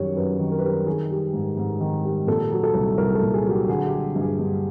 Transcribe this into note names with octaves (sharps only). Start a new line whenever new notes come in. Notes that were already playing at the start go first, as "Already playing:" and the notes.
Already playing: F#2 D#3 G3 C#5
F#2 B4
D#3
A#4
B4
G3 A#4
D#3 G#4
G3
G#2
G#2
D#3
G3
A#2 A4
F#3
A4
C2
C2 A#4
A4
A#2
G#4
F#3 G4
D3 G#4
G4
G3
G2
G#4
G2